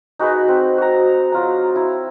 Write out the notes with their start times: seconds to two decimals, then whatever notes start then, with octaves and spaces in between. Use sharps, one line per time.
0.19 D#4 F#4 G#4 B4
0.48 C4
0.78 F#4 A#5
1.32 F#3 F4 A#5
1.76 E4